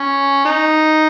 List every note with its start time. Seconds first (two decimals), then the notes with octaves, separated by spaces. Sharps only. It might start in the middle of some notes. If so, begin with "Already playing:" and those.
Already playing: C#4
0.45 D#4